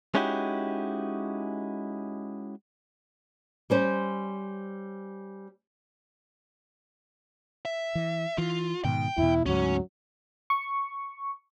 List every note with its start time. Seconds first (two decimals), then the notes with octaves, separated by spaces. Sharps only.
0.15 G#3 C#4 D#4 E4 F#4 G4
3.70 G3 C#4 C5
7.65 E5
7.95 E3
8.38 E3 F4
8.85 G#2 B2 D#3 G5
9.18 E2 B2 E4
9.46 D2 G#2 F#3 C#4
10.50 C#6